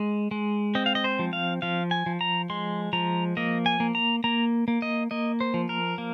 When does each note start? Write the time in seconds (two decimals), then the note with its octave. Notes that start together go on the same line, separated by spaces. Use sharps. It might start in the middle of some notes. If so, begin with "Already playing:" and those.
Already playing: G#3
0.31 G#3
0.75 C4 D#5
0.86 F5
0.95 D#5
1.04 C5
1.19 F3
1.33 F5
1.62 F3 F5
1.91 G#5
2.06 F3
2.21 A#5
2.50 G#3 C6
2.93 F3 A#5
3.37 A#3 D#5
3.66 G#5
3.80 A#3
3.95 A#5
4.24 A#3 A#5
4.68 A#3
4.82 D#5
5.11 A#3 D#5
5.41 C5
5.54 F3
5.69 A#4
5.98 A#3